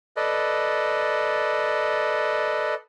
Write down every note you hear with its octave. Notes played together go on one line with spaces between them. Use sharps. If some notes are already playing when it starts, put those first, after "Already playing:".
A4 B4 D5 D#5